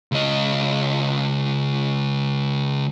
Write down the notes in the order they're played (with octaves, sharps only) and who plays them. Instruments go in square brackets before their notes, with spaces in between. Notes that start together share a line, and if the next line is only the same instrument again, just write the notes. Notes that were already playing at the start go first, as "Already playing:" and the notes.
[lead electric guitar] C#2 D#5